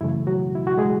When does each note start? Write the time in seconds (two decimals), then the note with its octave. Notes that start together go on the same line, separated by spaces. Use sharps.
0.01 F#2 C#3 E3 A3 E4
0.27 F#3 F#4
0.55 E4
0.67 F#4
0.78 G#3 G#4